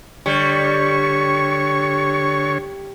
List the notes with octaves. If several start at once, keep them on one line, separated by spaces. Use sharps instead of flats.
D3 G3 C#5 C#6